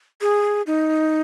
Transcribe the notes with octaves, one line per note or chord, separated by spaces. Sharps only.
G#4
D#4